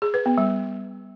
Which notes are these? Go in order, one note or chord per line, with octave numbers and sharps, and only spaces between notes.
G#4
B4
B3
G3